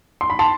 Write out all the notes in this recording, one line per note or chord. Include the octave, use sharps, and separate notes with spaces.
C6
B5
A5 C6